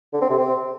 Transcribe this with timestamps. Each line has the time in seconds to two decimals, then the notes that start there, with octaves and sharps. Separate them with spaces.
0.13 D3
0.22 C4
0.30 C3
0.38 C4